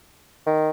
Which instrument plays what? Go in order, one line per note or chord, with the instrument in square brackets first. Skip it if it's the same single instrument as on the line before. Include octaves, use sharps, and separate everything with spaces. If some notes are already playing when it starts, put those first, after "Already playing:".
[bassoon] D#3